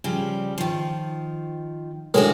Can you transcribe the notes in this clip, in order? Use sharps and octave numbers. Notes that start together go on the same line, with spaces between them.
C#3 F3 G3
D#3 F3
A2 D#3 G#3 D4 F#4 G#4